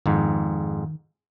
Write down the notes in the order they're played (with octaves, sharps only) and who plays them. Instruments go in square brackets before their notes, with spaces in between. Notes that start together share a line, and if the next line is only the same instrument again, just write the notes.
[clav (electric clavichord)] F2 G#2 [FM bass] D#3